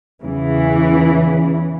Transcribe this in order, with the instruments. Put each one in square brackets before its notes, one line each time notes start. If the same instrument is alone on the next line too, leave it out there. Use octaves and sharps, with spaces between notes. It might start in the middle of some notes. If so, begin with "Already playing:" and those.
[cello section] E2 C#3 E3